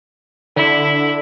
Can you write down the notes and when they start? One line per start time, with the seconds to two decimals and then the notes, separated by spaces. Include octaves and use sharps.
0.56 D3 E4